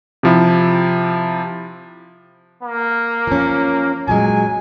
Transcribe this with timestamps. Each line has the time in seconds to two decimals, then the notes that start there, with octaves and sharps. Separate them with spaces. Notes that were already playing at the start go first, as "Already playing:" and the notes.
0.23 C3 F3 E4
2.63 A#3
3.27 F3 C#4
4.08 A#2 F#3 G#3 G#5